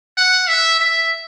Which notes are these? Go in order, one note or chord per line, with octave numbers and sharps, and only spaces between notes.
F#5
E5
E5